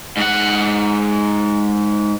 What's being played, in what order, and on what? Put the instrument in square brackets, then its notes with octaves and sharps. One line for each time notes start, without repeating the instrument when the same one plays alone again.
[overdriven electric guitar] G#2 F#5